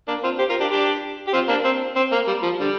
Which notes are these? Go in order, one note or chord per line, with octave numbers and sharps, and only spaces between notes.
A#3 D4
C4 F4
G4 C5
F4 A#4
D4 G4
D4 G4
G4
C4 F4
A#3 D4
C4
C4
A#3
G3
F3
D3 G3